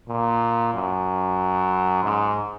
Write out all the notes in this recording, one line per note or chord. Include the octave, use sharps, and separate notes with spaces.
A#2
F#2
G#2